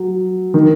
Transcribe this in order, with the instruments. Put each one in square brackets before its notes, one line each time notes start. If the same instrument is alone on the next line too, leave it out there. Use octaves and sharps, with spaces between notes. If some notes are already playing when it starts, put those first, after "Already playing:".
Already playing: [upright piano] F#3
D#3